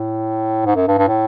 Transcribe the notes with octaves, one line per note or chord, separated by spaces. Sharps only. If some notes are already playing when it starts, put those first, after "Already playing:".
Already playing: A2
G#2
F#2
G2
G2
A2